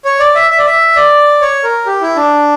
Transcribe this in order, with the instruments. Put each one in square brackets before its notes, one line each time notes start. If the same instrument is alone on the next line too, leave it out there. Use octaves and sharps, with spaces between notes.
[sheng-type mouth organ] C#5
D5
E5
E5
D5
E5
D5
C#5
A#4
G4
E4
D4